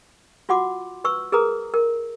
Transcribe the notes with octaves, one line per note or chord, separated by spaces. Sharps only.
F4 F#4 F#5 C6 D6
B4 C#6 E6
G#4 A#4 B4 A#5 D#6
A#4